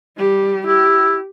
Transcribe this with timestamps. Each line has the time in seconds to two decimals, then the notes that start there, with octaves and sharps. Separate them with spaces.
0.17 G3 G4
0.67 E4 G4